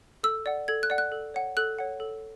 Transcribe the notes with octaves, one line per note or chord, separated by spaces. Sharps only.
A4 E6
D5 F#5
A4 G#6
F#6
D5 F#5
F#6
A4
C#5 F#5
A4 F#6
C#5 F#5
A4